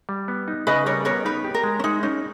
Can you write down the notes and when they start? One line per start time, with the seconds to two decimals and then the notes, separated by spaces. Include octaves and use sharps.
0.09 G3
0.28 B3
0.48 D#4
0.67 C#3 B4 D#5
0.86 G3 A#4 C#5
1.05 B3 A#4 C#5
1.25 D#4 B4
1.44 G4
1.54 A#4
1.63 G#3
1.79 C#4
1.84 G#3 D#4
2.03 C#4 D#4